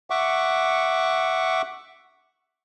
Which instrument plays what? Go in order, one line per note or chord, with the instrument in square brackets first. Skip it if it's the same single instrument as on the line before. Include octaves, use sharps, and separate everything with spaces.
[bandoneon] E5 F#5 C#6 D6